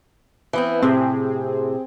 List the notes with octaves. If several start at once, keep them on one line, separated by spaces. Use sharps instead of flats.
E3 B3 C4
A2 C3 C4 G#4